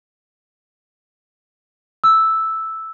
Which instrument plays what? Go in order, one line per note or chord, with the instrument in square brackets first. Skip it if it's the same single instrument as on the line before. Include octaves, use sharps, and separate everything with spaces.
[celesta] E6